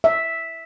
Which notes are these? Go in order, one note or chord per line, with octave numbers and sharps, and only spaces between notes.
E5